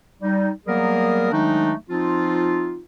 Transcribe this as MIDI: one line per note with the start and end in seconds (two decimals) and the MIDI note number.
0.22 0.50 55
0.22 0.50 63
0.67 1.28 54
0.67 1.28 55
0.67 1.28 58
0.67 1.28 59
0.67 1.28 68
0.67 1.28 70
1.31 1.73 51
1.31 1.73 54
1.31 1.73 56
1.31 1.73 57
1.31 1.73 62
1.31 1.73 63
1.90 2.80 53
1.90 2.80 60
1.90 2.80 63
1.90 2.80 65